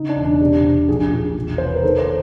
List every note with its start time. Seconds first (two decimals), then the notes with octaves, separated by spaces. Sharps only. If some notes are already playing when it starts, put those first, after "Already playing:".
Already playing: C#3 D#4
0.09 D4
0.17 E1
0.25 D4
0.41 C3
0.64 C3
0.88 A#1 G#4
1.12 A#1
1.36 E1
1.58 C3 C5
1.66 B4
1.75 A#4
1.83 D#3 A4
1.98 C5